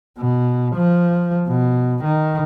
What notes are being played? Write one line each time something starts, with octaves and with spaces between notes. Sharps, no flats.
B2
F3
B2
D#3